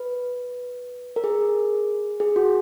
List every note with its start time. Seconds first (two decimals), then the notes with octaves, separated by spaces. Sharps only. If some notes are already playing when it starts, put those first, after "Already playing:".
Already playing: B4
1.16 A#4
1.24 G#4
2.20 G#4
2.36 F#4